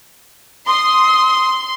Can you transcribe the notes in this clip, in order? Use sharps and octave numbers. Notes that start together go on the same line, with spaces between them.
C6 D#6